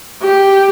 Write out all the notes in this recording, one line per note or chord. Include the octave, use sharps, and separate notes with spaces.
G4